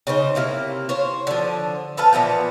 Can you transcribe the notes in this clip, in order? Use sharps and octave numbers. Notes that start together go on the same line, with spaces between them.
C#3 D#4 C5
C3 A#3 E4
C5 C#5
D3 F3
A4 B4 F5 A5
A#2 E3 F3 B3